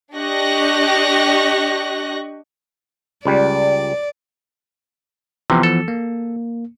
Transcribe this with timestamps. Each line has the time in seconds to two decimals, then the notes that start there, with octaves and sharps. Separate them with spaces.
0.14 D4 G4 D#5 C#6 F#6 A#6
3.25 C#2 G3 D5
5.50 C3 E3 F3 B3
5.63 A4
5.88 A#3